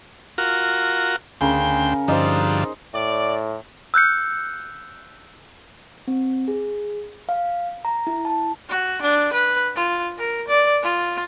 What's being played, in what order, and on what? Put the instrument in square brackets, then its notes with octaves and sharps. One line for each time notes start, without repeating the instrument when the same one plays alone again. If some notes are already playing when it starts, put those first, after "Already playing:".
[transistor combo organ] F4 F#4 A#4
[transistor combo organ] D2 G5 C6 [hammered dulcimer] C#3 A#4
[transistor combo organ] G2 D3 F3 [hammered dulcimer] D#4 C5
[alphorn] A2 [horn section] D5
[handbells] E6 F#6 G6 C#7
[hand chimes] C4
G#4
F5
A#5
E4
A5
[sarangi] F#4
D4
B4
F4
A#4
D5
F4